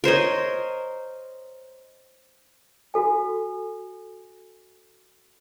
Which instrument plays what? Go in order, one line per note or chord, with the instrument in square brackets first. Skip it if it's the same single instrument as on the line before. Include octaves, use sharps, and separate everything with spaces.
[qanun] A#4 C5 C#5 D#5
[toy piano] F#4 A4 G#5